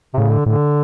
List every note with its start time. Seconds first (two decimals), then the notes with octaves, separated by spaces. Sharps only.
0.14 C3
0.18 A2 C#3
0.32 D3
0.46 A2 D3